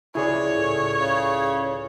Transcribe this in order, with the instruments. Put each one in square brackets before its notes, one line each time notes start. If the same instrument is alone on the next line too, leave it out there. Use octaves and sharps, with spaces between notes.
[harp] C#2 [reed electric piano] E4 G#4 D5 [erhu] C#5
[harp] A2
[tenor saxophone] C#3